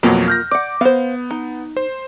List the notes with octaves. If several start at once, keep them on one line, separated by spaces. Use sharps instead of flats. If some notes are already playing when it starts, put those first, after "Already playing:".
F2 B2 F#3 A#3 F4 A#4
F6 G6 A#6
D5 F#5 D6
B3 C5 F5
D#4
C5